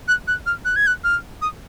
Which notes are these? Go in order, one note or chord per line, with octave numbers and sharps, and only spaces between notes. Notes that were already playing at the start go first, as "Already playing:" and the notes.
F#6
F#6
F6
F#6
G#6
F#6
F6
D#6